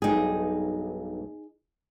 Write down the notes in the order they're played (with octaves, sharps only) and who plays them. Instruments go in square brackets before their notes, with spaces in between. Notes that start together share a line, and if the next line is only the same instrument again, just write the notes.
[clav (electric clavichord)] B1 G2 G5 [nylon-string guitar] D#4 G#4